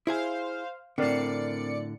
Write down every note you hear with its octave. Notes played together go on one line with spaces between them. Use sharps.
E4 G#4 C5 F5 G#5
A2 D3 C4 A#4 D5 C7 C#7